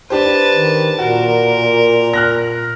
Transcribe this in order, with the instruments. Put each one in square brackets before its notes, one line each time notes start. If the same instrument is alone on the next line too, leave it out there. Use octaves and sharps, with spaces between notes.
[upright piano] D4 G4 C5 [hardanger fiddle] B4 A5
[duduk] D#3
[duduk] A#2 [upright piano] F#4 [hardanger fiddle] A#4
[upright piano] F6 F#6 A#6